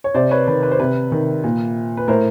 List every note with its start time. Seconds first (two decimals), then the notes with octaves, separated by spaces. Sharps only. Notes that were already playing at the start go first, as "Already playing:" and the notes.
0.04 C#5
0.14 C3 C5 D5
0.31 B4 C#5
0.47 D#3 B4
0.63 B4
0.71 C5
0.80 C3 B4
1.12 D#3
1.44 A#2
1.97 B4
2.08 A2 A#4 C5